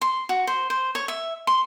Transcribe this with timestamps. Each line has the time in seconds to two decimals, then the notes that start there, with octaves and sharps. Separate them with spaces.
0.02 C6
0.29 F#4
0.47 C5
0.70 C5
0.95 C#5
1.08 E5
1.47 C6